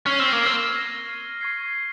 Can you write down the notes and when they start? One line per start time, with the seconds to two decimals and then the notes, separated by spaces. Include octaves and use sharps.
0.06 C#4 C#6 F6 G#6 C7 G7
0.19 C4
0.33 A#3
0.46 C4
0.74 F6 A#6 D#7 G7
1.41 C#6 G#6 C7